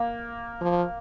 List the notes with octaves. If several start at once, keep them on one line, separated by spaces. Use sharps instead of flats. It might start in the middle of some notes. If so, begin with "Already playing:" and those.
Already playing: A#3
F3